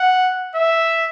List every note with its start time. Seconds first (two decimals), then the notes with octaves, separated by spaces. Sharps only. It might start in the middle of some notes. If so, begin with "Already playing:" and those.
Already playing: F#5
0.55 E5